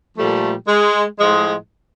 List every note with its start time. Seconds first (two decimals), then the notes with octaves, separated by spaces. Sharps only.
0.17 A#2 F3 G3 A3
0.68 G#3
1.19 A2 F3 G#3